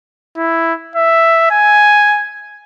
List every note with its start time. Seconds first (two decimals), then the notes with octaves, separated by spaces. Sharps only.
0.37 E4
0.96 E5
1.51 G#5